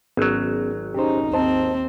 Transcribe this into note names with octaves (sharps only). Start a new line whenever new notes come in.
G#1 F#3 B3 C#4
C#4 D#4 G4 C5
D#2 C4 C5 D#5 A5